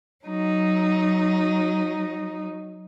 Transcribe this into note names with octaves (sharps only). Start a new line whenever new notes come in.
F#3 D#4